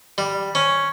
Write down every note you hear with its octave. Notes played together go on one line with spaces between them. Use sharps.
G3
C#4